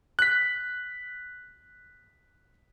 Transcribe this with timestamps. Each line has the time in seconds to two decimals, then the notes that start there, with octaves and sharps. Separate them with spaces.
0.19 F#6 B6